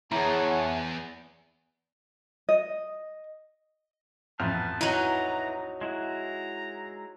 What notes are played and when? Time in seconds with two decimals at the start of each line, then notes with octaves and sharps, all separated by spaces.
0.12 E2 E4 G#4 C#5 F#5 A5 A#5
2.49 D#5
4.40 A1 F2 B3 A5 F6
4.81 F#3 D#4 E4 B4 G#5 A#5
5.81 G#3 E4 F#4 A#5